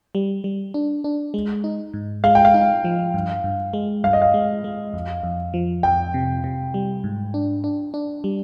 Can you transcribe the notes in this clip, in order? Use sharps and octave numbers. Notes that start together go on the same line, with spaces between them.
G3
G3
D4
D4
G#3
D#4
G#2
G#3 F5
G5
F5
D#4
F3
G2
G2
G#3
G2 F5
D#5
F5
G#3
G#3
F2
F2
F3
F2 G5
C3
C3
G3
G#2
D4
D4
D4
G3